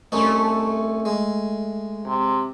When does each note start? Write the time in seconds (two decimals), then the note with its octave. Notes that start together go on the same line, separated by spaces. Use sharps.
0.12 C2 A3 C#4 D#4
1.05 G#3
2.06 C3